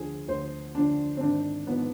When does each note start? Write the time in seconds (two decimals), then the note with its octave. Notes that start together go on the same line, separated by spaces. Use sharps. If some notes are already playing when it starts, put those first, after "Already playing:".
Already playing: D2 D3 F3 G#4
0.28 D2 C5
0.74 D3 F3 D4
1.17 C4
1.21 G#1 D4
1.67 G#2 F3 B3